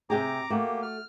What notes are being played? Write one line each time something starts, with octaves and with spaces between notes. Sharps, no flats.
C3 G4 G#4 A#5 D6
A3 A#3 F#4 G4
F6